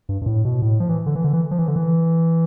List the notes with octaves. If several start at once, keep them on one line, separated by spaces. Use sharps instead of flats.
G2
G2
A2
B2
A2
F3
E3
D3
E3
D3
E3
F3
E3
D3
E3